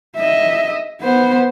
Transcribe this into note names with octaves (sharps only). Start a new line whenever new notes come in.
D#5 E5
B3 C5